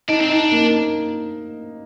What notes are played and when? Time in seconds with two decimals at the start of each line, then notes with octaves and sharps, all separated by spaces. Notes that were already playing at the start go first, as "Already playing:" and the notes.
0.08 D4 D#4
0.21 C4
0.30 D4 D#4
0.52 A#3